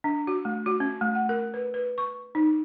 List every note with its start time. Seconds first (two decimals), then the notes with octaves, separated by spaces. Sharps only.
0.04 D4
0.27 F#4
0.45 A3
0.66 F#4
0.80 C#4
1.01 A3
1.15 F#5
1.29 A#4
1.54 B4
1.74 B4
1.98 C#6
2.35 D#4